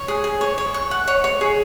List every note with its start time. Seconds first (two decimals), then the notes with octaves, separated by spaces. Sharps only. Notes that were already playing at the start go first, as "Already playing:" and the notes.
Already playing: C#5
0.08 G#4
0.24 G#4
0.41 C#5
0.58 C#5
0.74 C#6
0.91 F#5
1.08 C#5
1.24 C#5
1.41 G#4